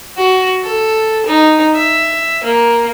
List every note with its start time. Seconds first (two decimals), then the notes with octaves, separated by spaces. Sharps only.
0.17 F#4
0.63 A4
1.26 D#4
1.74 E5
2.43 A#3